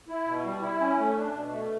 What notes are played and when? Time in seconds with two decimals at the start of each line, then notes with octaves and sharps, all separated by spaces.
0.08 E4
0.26 B2
0.45 G3
0.62 E4
0.80 C#4
0.99 A3
1.17 D4
1.34 B2
1.52 A3